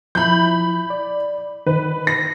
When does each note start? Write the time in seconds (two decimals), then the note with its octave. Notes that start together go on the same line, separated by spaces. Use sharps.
0.15 F3 E4 B5 G6
0.90 D5
1.66 D#3 B4
2.07 A#6